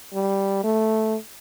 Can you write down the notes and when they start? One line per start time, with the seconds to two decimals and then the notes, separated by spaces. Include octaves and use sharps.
0.14 G3
0.64 A3